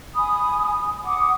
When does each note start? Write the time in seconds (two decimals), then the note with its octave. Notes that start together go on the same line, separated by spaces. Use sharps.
0.15 G#5 B5 D#6
1.05 F#5 D6 D#6